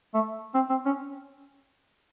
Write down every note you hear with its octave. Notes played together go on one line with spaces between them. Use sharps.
A3
C4
C4
C#4